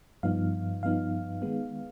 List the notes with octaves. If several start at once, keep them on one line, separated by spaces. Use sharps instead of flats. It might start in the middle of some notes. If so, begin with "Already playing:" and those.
G2 F3 B3 D#4 F5
G2 F3 B3 D#4 F5
D#3 G#3 B3